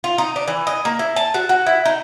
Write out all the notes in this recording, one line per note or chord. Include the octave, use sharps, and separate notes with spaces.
F4
D#4
D4
E3
D#5
A#3
E4
A5
F#4
F#4
E4
D#4